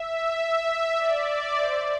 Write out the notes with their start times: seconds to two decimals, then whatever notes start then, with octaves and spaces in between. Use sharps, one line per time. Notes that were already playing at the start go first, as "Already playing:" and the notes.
Already playing: E5
0.36 E5
0.97 D5
1.56 C5